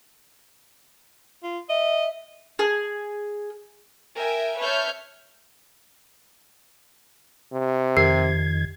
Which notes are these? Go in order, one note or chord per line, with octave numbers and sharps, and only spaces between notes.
F4
D#5 E5
G#4
A#4 E5 G5 G#5
B4 C#5 E5 A5 F6 G6
C3
F2 D#3 G4 G#6 C7